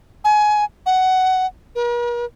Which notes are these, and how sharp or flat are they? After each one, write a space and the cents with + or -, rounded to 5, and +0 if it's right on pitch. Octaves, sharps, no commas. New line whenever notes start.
G#5 +20
F#5 +15
A#4 +45